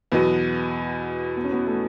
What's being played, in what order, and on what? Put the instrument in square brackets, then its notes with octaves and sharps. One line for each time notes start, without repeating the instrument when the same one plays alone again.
[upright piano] E2 B2 F#3 [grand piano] B3
[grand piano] B3
C#4
B3
A3